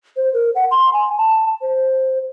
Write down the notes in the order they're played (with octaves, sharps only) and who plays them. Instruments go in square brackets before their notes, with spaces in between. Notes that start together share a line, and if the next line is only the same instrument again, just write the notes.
[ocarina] C5
A#4
F#5
C6
G#5
A5
C5